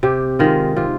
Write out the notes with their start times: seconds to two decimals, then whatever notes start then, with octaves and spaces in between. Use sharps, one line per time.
0.03 C3 G4
0.39 D#3 G#3 F4
0.76 C3 F4